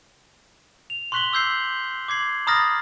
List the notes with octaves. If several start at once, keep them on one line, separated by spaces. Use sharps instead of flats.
F7
C6 C#6 F#6 B6 F#7 G7
D6 E6 G6 C7
D6 G#6 C7 F#7
A#5 B5 D#6 F6 A6 A#6